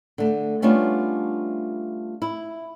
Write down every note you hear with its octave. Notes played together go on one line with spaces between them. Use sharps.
D3 A3
G3 A3 B3 C#4 D4 F4
E4